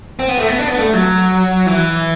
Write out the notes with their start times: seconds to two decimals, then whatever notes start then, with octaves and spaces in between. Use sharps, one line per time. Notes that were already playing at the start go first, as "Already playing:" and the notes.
0.19 C4
0.29 B3
0.39 A3
0.48 B3
0.59 D4
0.68 B3
0.78 A3
0.93 F#3
1.66 E3